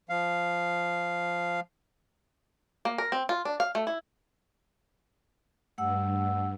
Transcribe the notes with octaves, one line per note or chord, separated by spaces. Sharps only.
F3 F5
A#3
A#4
C4
F4
D4
F5
A3
E4
G2 A3 F#5 E6